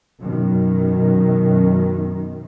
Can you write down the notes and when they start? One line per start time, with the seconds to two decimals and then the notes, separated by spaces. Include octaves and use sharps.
0.19 F#2 B2 D#3